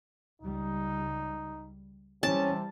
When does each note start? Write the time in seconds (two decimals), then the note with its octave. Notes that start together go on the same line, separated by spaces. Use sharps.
0.42 C#2 G3 D#4
2.23 C3 E3 G3 C#4 A5